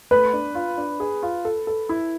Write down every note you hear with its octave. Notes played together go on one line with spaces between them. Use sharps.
A3 B4
D4
F4
D4
G#4
F4
A4
A4
E4